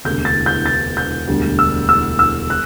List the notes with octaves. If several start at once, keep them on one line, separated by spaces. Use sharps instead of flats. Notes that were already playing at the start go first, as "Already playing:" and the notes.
E1 D2 C3 G6
A6
G6
A6
G6
E1 D2 D3 G3
E6
E6
E6
F#6